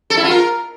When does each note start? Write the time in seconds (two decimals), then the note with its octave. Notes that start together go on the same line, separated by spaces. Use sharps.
0.10 A4
0.17 E4
0.24 F4
0.31 A#4